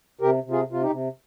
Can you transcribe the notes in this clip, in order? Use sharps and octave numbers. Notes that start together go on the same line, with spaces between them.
C3 G4 A#4
C3
F4 G#4
C3 F4
D#4 G4
C3